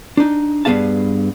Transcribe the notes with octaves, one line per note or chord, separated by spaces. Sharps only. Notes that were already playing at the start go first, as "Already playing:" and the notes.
D4 D#4
G2 F3 B3 G#4 F5 A5